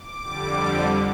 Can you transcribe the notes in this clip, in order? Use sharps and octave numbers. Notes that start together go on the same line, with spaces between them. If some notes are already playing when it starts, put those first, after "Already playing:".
Already playing: D6
F2 D3 G3